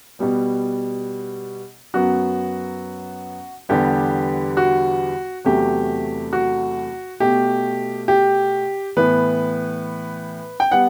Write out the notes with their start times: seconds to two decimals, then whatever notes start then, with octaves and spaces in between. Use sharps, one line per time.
0.19 B2 G3 B3
1.94 F#2 F#3 B3 F#4
3.69 E2 D3 G3 B3 G4
4.57 F#4
5.45 E2 C3 F#3 A3 G4
6.33 F#4
7.20 B2 A3 G4
8.08 G4
8.97 A2 E3 B3 B4
10.60 G5
10.72 G3 B3 F#5